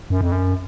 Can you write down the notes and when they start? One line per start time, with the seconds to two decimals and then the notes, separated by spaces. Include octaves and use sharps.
0.10 F#2
0.21 F2
0.32 F#2